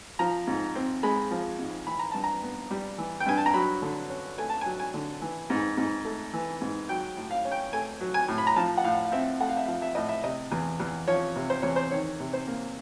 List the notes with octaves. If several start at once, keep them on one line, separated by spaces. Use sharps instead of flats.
F3 A#5
G#2
C4
G#3 B5
F3
G#2
E3 B5
A#5
G2 A5
A#5
B3
G3
E3
G5
G2 G#5
A5
A#5
F#3 B5
D3
C#4
A3 G#5
A5
F#3 G#5
G#5
D3
E3
G#2
G#2
A3
E3
G#2
F#3 G5
A2
F5
C#4
G5
A3 G#5
F#3
G#5
A2
B5
A#5
F3 A5
F#5
A2 F5
F5
C4 E5
A3 F#5
F5
E5
F3 F5
E5
A2 D#5
E5
C3 D#5
E2
E2
F3 C#5
C3
C5
E2 C#5
C5
D#3 C#5
C3
C5
A#3